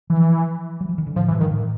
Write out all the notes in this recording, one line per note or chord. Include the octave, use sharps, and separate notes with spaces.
E3 F3
F#3
F3
D#3
D3
A2 F3
G2 E3
G#2 D#3
A2